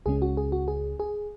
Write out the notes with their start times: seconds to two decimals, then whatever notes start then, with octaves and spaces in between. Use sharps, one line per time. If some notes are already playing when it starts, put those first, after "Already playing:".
0.06 C#2 C#3 G#3 C#4 G#4
0.22 F#4
0.37 G#4
0.52 F#4
0.68 G#4
1.00 G#4